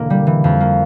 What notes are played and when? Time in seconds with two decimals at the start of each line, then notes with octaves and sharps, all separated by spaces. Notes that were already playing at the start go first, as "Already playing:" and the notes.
Already playing: E1 D3 A#3
0.10 G3
0.27 E3
0.44 F2
0.60 A#3